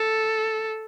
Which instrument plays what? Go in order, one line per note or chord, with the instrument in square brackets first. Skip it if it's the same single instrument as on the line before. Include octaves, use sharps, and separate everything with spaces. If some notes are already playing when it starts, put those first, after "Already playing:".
Already playing: [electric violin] A4